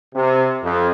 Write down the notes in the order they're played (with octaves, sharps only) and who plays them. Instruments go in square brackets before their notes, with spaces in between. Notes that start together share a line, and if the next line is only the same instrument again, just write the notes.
[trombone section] C3
F2